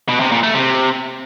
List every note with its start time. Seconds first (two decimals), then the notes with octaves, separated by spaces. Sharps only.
0.09 B2
0.20 C3
0.32 A#2
0.43 A3
0.55 C3